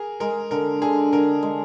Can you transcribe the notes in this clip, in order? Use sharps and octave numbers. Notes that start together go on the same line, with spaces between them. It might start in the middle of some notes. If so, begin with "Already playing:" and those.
Already playing: G#4 A#4
G#3 A#4
D3 A#4
D3 G#4
D3 A#4
G#3